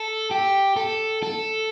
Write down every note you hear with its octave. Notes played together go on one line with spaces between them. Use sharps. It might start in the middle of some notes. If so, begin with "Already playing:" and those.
Already playing: A4
G4
A4
A4